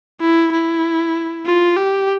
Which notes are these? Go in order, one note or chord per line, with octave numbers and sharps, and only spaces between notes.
E4
E4
F4
G4